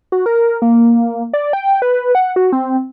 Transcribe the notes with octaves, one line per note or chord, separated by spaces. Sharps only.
F#4
A#4
A#3
D5
G5
B4
F#5
F#4
C4